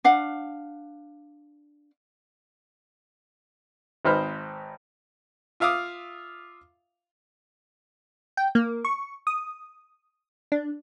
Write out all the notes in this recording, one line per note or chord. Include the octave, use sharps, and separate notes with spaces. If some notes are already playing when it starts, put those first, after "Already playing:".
D4 F5 F#5
G#1 D#4 B4 C5 B5 F6
F4 E5 F5 D6 D#6
G5
A#3
C#6
D#6
D4